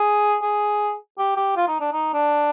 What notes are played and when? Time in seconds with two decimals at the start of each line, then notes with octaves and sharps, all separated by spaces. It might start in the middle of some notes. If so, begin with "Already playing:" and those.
Already playing: G#4
0.42 G#4
1.18 G4
1.36 G4
1.56 F4
1.68 D#4
1.80 D4
1.92 D#4
2.13 D4